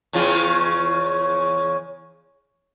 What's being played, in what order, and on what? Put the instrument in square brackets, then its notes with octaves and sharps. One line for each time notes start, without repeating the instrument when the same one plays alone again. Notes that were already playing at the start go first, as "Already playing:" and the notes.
[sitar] E2 C#3 F4